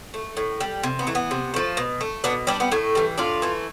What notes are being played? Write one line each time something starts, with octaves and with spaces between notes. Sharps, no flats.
A3
A2
G3
C3
B3
E3 A3
B3
C3
F3 A3
B2
A3
B2 B3 D4
G3 B3 D4
B3
A2 A3
E3 G3
A2 D4 F4
E3 A3